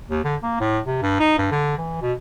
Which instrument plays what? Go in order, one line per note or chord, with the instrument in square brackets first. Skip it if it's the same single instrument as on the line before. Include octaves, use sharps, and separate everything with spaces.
[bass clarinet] D#2
D3
A#3
A2
C3
G2
D#4
G2
D3
E3
B2